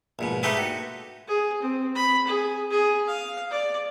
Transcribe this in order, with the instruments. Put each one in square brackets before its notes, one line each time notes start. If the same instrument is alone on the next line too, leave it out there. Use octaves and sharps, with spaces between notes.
[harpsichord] A#1 G#2 B2
G#3 A3 D#4 G4 A4 B4
F#4
[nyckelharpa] G#4
C4
B5
G#4
G#4
F5
D5